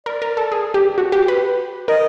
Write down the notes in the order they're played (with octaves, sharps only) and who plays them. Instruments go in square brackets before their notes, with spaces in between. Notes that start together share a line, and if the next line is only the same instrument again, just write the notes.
[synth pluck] A#4 [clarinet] D5
[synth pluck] A#4
A4
G#4
G4
F#4
G4
B4
[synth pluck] A#4 [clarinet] D#5